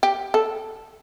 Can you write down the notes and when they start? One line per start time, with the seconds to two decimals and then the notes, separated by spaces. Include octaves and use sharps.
0.03 G4
0.34 A4